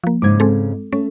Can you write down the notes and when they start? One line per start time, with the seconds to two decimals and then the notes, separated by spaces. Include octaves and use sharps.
0.04 F3 A#3
0.22 G#2 C#3 D#4 D6 G#6
0.40 G#3 C4 A4
0.93 A3 C#4